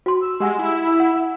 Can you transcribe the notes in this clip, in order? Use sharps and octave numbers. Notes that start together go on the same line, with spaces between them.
F#4 C6
E6
G#3 G4 F#5 G#5
E4
F#5